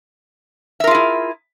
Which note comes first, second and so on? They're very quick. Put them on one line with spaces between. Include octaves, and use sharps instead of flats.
E5 A#4 F4 G#4 E4